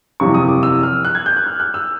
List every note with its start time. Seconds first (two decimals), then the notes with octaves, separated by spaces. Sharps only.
0.20 F#1 E2 C3 F3 C#6
0.34 D#6
0.48 D6
0.63 E6
0.83 F6
1.05 F#6
1.15 G#6
1.26 G6
1.36 F#6
1.47 F6
1.60 F#6
1.74 E6